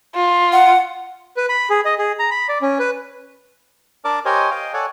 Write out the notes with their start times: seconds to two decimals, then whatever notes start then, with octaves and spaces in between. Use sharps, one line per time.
0.15 F4
0.52 F#5
1.37 B4
1.49 B5
1.70 G#4
1.85 D#5
1.98 G#4
2.19 A#5
2.31 B5
2.49 D5
2.62 C#4
2.79 B4
4.05 D4 A#4 D5 A5 D6
4.25 G4 A#4 C5 C#5 D#5 G#5
4.51 D#5 F5 G5
4.73 A4 C#5 D5 F#5 G#5